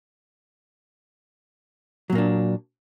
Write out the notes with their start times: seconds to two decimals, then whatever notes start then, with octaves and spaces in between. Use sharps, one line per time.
2.10 F#3
2.12 A#2
2.15 A#3
2.18 D4